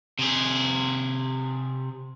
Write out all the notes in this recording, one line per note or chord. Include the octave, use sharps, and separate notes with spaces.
C3 G#4